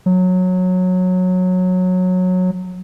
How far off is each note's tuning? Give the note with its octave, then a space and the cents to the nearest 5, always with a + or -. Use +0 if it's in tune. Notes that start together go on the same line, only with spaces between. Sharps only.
F#3 -15